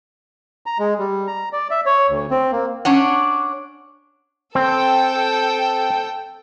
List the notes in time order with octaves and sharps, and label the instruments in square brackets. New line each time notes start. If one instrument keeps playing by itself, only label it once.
[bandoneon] A#5
G#3
G3
A#5
D5
E5
C#5
D2
C4
A#3
[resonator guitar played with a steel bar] C#4 D4 C#5 F#5
[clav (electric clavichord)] C4 [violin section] A4 G5